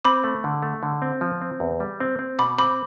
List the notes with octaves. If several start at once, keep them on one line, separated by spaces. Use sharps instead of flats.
C4 B5 D6
A3
D3
A3
D3
C4
F3
C4
E2
G3
C4
C4
B2 B5 D6
C4 B5 D6